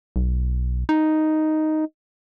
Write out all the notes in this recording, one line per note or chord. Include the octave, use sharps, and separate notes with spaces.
B1
D#4